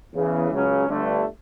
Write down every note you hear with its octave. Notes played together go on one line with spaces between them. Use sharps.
E2 C#3 E3
C#2 C#3 F#3 C#4
G1 G2 D3 A3